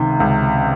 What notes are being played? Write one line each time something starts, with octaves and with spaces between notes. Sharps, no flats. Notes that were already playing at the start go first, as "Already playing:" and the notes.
Already playing: C#2 C3 D#3
C#2